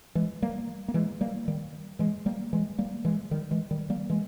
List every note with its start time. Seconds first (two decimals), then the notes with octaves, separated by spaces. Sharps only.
0.15 E3 G#3
0.42 G3 A#3
0.88 A#3
0.94 E3 G#3
1.21 G3 A#3
1.48 D#3 G3
1.99 E3 G#3
2.26 G3 A#3
2.53 E3 G#3
2.78 G3 A#3
3.05 E3 G#3
3.31 D#3 G3
3.51 E3 G#3
3.71 D#3 G3
3.90 G3 A#3
4.10 E3 G#3